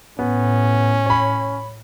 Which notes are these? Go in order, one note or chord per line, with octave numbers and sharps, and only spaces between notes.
A2 B3 C#4
C#5 B5